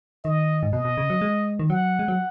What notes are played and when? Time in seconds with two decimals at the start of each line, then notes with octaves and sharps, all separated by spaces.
0.24 D#3 D#5
0.63 G#2
0.72 B2 D#5
0.85 B2
0.97 C#3
1.10 F#3
1.21 G#3
1.59 D#3
1.70 F#3 F#5
1.99 G#3
2.08 F#3